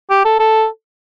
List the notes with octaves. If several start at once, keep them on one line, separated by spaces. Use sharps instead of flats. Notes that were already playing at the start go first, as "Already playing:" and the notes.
G4
A4
A4